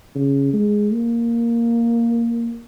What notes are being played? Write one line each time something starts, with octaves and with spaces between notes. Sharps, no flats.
C#3
G#3
A#3